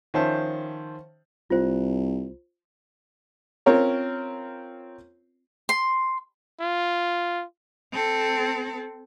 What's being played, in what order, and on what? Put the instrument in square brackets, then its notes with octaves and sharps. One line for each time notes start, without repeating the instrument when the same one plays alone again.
[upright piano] D#3 F3 C#4 C5 E5 A5
[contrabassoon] C2 [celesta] F4 C5
[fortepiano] C4 C#4 F4 A#4 C#5
[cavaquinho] C6
[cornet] F4
[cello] C4 A4